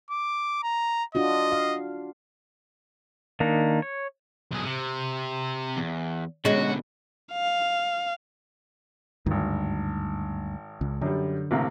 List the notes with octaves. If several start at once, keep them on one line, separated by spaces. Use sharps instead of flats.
D6
A#5
D4 F4 F#4 D#5
F5
D#3 A#3 D4 D#4
C#5
B1 G#4
C3
E2
B2 D3 G#3 C#4 F#4
F5
G#1 D2 G2 D#3
C#2
F#2 D3 G3
A1 C3 A#3